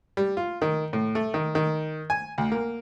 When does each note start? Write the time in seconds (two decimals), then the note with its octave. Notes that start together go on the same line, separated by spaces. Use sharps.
0.17 G3
0.37 F4
0.62 D#3
0.93 A2
1.15 A3
1.34 D#3
1.55 D#3
2.10 G#5
2.38 D2
2.52 A#3